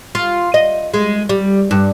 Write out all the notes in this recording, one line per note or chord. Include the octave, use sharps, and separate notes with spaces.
F4
D#5
G#3
G3
G2